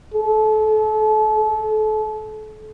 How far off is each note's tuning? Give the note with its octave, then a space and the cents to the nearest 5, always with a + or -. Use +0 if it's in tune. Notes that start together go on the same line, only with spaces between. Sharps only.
A4 -35